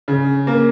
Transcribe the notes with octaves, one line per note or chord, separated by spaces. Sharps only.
C#3
A#3